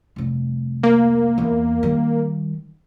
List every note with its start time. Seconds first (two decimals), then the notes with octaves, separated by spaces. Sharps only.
0.16 F1 C2
0.83 A#3
1.38 E2
1.83 D#3 G3